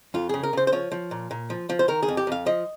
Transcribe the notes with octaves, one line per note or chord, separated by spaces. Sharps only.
F2 F4
C#3 G#4
A#4
C#3 C5
C5
F3 C#5
F3
A#2
A#2
F3
F3
C5
D#3 A#4
G#4
F2
G4
F2 F5
F3 D#5